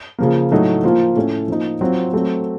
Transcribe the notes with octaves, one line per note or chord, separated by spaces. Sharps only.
C#3 F3 A#3
A2 F#3 A3 D#4
F3 A#3 F4
A2 A3 C#4
F3 A#3 D#4
F#3 C4 F4
F#3 A3 C4